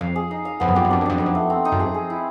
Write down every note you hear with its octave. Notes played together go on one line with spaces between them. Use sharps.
F2 F5
G#4
D#4
F5
F2 B3
F#2
F2 G4
F#2
F2 D4
F#2
F2 D4
F#2 D#4
F2
A3
C4
D#4
F#2
F2 G#4
G#4
E4